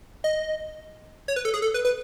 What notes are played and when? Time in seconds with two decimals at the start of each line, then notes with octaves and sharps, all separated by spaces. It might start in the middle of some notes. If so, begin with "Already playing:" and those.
0.24 D#5
1.28 C#5
1.36 B4
1.45 A4
1.54 G#4
1.62 A4
1.74 B4
1.85 B4